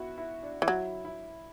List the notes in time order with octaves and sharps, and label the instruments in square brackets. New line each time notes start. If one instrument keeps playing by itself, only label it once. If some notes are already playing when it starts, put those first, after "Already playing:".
Already playing: [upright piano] B3 E4 F#4
E4
D4
[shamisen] E3
[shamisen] F#3 [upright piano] E4
[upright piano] E4